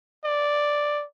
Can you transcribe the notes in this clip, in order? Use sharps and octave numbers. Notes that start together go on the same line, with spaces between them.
D5